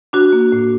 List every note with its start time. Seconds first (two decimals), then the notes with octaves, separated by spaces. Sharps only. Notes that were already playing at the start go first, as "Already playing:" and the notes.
0.13 D4 F#4
0.32 A#3
0.52 A2